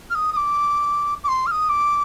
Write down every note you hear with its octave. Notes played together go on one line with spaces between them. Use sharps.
F6
D#6
D#6
D6
D6
C6
F6
D#6
D6